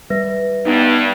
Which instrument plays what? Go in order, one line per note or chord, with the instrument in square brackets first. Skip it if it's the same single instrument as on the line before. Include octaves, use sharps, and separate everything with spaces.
[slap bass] G3 [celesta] B4 E5 A#6
[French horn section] G2 [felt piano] B3 D#4